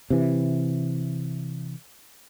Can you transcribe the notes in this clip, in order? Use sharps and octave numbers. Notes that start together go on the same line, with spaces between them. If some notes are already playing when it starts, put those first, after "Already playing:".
C3 E3